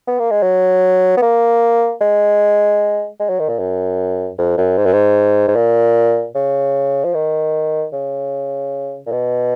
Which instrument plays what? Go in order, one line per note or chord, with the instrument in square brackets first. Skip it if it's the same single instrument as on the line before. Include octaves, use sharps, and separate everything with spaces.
[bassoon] B3
A#3
G#3
F#3
B3
A#3
G#3
G#3
F#3
D#3
A#2
F#2
F2
F#2
G#2
F#2
G#2
G#2
A#2
C#3
F3
D#3
C#3
A#2
B2